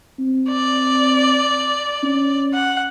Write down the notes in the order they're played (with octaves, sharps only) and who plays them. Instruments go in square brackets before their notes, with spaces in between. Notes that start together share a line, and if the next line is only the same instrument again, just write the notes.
[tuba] C4
[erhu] D5
[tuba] C#4
[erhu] F#5